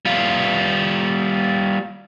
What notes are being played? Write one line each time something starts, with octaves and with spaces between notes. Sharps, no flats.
G3 F4